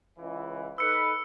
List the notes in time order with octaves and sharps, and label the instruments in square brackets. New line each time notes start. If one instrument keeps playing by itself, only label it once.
[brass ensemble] C#2 E3
[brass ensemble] D#4 A4 B4 [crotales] E6 C#7